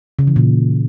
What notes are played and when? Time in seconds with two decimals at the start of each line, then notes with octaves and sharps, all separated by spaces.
0.19 C#3
0.27 E3
0.36 A#2